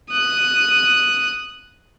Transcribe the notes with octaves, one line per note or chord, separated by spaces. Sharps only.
D#6 F#6